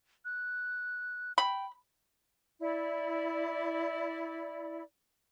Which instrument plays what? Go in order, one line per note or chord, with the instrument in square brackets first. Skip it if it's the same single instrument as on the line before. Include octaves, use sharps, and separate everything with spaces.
[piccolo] F#6
[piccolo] G5 [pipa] B5
[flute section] E4 D5